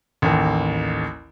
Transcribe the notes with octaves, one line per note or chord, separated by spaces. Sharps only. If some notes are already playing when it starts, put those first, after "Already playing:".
A1 D#2